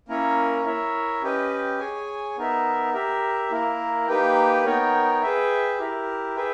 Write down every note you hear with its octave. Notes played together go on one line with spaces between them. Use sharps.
A#3 C#4 E4 A#4 C#5
E4 A#4 C#5 E5
C#4 G4 B4 D#5 G5
G#4 C#5 G#5
B3 D#4 A#4 E5
G4 A#4 E5
A#3 E4 A#4
A#3 D#4 G4 B4 G5
B3 D#4 A#4 C#5 G5
G#4 B4 E5 G5
E4 G4 A#4
G#4 B4 E5 G5